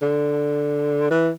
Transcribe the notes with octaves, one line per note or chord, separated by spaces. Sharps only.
D3
E3